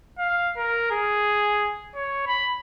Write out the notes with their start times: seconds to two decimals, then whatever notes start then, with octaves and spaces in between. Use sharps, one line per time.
0.18 F5
0.57 A#4
0.91 G#4
1.95 C#5
2.27 B5